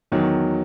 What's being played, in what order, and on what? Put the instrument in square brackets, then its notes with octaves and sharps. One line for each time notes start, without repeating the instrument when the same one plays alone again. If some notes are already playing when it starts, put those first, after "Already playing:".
[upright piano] E2 D#3 F#3